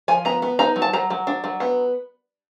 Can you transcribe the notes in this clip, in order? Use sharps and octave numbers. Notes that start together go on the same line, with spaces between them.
F3 G#5
B3 A#5
B3
D#4 A#5
F#3
A5
F#3 A#5
F#3
D4
F#3
B3